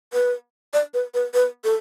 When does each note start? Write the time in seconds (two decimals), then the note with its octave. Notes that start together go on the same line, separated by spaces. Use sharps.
0.13 B4
0.73 D5
0.94 B4
1.14 B4
1.34 B4
1.64 A4